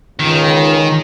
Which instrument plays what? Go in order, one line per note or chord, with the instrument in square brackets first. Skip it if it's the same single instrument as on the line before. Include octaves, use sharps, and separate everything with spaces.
[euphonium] C#2 [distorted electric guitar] D#3